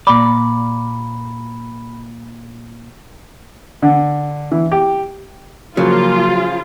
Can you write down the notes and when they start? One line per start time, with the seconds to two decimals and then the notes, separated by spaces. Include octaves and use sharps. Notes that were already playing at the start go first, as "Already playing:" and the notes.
0.07 A#2 D5 B5
3.82 D3
4.52 E3
4.72 G4
5.77 C#3 F3 F#3 A#3 F4